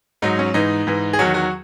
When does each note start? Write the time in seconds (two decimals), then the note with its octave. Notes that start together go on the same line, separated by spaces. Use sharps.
0.22 G#2 F#3 D#4
0.39 C#4
0.54 G#2 E3 D#4
0.87 G#2 E3
1.13 G#4
1.19 E2 D#3 F#3 F#4
1.34 F#3 F#4